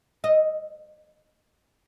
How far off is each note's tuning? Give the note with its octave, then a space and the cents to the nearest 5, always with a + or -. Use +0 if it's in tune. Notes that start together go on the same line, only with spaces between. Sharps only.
D#5 +0